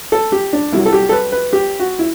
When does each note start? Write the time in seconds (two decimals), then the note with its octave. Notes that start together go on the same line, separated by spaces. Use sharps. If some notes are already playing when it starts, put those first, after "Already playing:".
0.12 A4
0.32 G4
0.53 D4
0.72 C2 C3 F#3 E4
0.86 A4
0.93 G4
1.09 A4
1.12 B4
1.32 B4
1.53 G4
1.80 F#4
1.99 E4